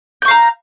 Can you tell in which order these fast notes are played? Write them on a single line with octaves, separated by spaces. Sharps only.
G6 C#6 F5 A#5